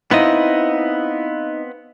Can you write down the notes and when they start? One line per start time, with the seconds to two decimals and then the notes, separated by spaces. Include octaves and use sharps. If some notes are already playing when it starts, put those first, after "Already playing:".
0.11 B3 C4 D#4 E4 D#5 F5